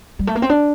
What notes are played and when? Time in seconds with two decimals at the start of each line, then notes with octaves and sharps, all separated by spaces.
0.19 G3
0.27 A3
0.35 A#3
0.42 C4
0.49 D4